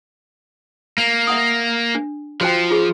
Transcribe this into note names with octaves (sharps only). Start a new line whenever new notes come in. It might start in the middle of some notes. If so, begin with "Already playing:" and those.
A#3
E5 F#5 D#6
D4
F3 F#4 C5 G5
F4 G#4